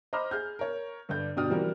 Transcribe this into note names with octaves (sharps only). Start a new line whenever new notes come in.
C5 D#5 A#5 B5 D6 F6
G#4 F6 G6
A#4 C#5
G2 D3 D4 G6
G1 B2 D4 G5 D#6 F6
E3 F3 G3 C4 F#4 A#4